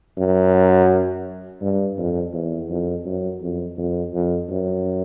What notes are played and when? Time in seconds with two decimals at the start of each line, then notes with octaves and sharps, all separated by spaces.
0.17 F#2
1.62 G2
1.97 F2
2.34 E2
2.70 F2
3.05 F#2
3.41 F2
3.78 F2
4.13 F2
4.50 F#2